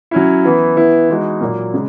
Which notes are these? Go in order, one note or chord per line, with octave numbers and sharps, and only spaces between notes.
F#3 C#4 E4
E3 B3 E4
E3 B3 E4
E3 G#3 D#4 F#4
A#2 F#3 A#3
C#3 G#3